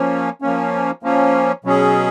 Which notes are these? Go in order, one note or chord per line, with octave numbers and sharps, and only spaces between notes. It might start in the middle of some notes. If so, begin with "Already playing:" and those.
Already playing: F3 A#3 C#4
F3 A#3 C#4
F3 A#3 C#4
B2 F#3 C#4 G#4